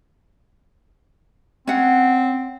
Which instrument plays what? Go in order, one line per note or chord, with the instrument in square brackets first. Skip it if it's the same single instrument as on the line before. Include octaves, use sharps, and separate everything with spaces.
[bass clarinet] C4 [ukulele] C#4 F#5